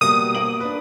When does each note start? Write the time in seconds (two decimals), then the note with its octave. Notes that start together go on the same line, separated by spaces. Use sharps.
0.01 B2 G3 A#3 D#6
0.35 A#3 D7 F#7
0.60 D4 B4